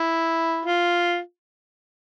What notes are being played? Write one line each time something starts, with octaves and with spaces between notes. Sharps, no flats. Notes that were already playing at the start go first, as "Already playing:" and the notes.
Already playing: E4
F4